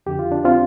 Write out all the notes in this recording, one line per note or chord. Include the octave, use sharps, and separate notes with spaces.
F2 D3 G4
F4
D4
C4 F4